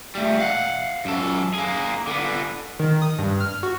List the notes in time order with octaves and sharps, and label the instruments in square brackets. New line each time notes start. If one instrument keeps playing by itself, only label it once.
[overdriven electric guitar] G3 A3
F5 F#5
F#2 A4
A#3 G#4
D3 B3
[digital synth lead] D#3
D#6
G2
F6
F#4